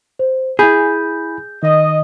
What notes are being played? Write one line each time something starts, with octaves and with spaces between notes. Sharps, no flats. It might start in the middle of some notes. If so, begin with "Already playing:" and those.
C5
E4 G#4 G#5 B5 G6
D#3 D#5